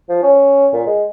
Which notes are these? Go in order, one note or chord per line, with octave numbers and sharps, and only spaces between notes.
F3
C#4
A#2
G#3